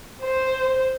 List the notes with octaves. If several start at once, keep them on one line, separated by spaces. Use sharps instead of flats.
C5